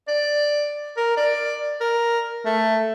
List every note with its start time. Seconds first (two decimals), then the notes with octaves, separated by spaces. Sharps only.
0.08 D5
0.97 A#4
1.17 D5
1.80 A#4
2.45 A3